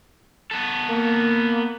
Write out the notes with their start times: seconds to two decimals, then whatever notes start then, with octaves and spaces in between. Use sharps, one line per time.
0.51 B3 A4
0.90 A#3